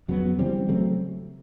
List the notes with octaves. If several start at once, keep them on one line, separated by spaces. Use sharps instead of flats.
F2 C#3 F#3 B3
C#3 E3 G3 C4
C#3 F#3 A3 C4